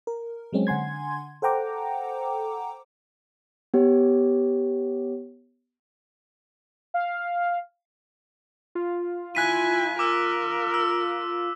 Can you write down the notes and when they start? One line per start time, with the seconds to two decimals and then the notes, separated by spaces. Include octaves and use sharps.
0.07 A#4
0.53 F#3 G#3 C4 C#4
0.67 D3 F#5 G#5 C6 G#6
1.42 A4 C5 F#5 G5 A#5 D6
3.74 B3 G4 C#5
6.94 F5
8.75 F4
9.35 E4 G#5 F#6 B6 D#7
9.99 A#4 D6 E6
10.74 E6